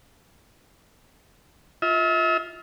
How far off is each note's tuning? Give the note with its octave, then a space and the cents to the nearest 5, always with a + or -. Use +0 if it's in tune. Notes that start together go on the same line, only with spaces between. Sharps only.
F4 +0 E5 -40